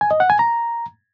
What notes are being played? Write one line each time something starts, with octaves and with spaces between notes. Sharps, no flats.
G#5
D#5
F#5
G#5
A#5